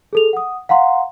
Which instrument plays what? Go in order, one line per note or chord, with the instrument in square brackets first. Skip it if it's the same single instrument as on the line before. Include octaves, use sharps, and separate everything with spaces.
[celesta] G#4 A4 F7
F#5 D#6
F5 F#5 A#5 C6